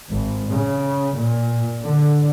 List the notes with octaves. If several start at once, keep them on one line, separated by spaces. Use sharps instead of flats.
G#1
C#3
A#2
D3